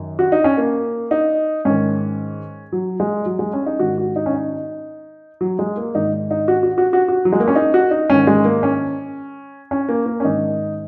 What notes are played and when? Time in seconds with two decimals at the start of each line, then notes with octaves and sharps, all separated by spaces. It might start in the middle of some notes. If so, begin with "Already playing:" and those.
Already playing: F#2 D#3
0.19 F#4
0.32 D#4
0.44 C#4
0.58 A#3
1.11 D#4
1.65 G#2 D#3 C#4
2.72 F#3
3.00 G#3
3.26 F#3
3.39 G#3
3.53 C#4
3.66 D#4
3.80 G#2 D#3 F#4
3.98 F#4
4.16 D#4
4.26 C#4
4.34 D#4
5.41 F#3
5.59 G#3
5.77 A#3
5.95 G#2 D#3 D#4
6.31 D#4
6.48 F#4
6.63 F#4
6.78 F#4
6.93 F#4
7.08 F#4
7.25 F#3
7.33 G#3
7.40 A#3
7.48 C#4
7.55 D#4
7.74 F#4
7.91 D#4
8.10 G#2 D#3 C#4
8.27 G#3
8.45 A#3
8.63 C#4
9.71 C#4
9.89 A#3
10.06 A#3
10.20 C#4
10.25 G#2 D#3 D#4